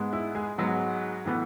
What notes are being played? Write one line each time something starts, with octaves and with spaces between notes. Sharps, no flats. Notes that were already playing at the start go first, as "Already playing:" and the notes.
Already playing: G#2 G#3 B3
E4
G#3 G#4
G#2 F#3 G#3 B3 F#4
A2 E3 B3